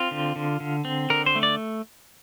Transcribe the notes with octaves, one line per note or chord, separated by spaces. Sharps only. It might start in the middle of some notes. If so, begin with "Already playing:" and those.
Already playing: C4 F4
D3
D3
D3
C4
D3 A#4
C5
A3
D5